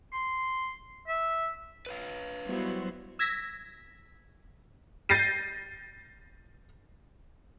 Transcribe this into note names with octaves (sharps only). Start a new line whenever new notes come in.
C6
E5
B4 C#5 F5
F#3 G3 B3 E4 F#4 C5
E6 G#6 A#6 B6
G6 A6 A#6 C7 D#7